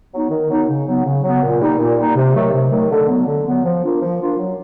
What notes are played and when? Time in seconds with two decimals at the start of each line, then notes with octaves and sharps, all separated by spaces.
0.12 F#3 B3 D#4
0.30 D#3
0.49 F#3 B3 D#4
0.68 C#3
0.87 F#3 B3
1.04 C#3
1.23 F#3 B3
1.42 A#2
1.61 G3 A#3 D#4
1.79 A#2
1.97 G3 A#3 D#4
2.16 C3
2.34 D#3 F#3 A3
2.53 C3
2.71 D#3 F#3 A3
2.91 D3
3.08 F#3 B3
3.27 D3
3.46 F#3 B3
3.64 F3
3.83 A#3 D4 F4
4.02 F3
4.20 A#3 D4 F4
4.38 F#3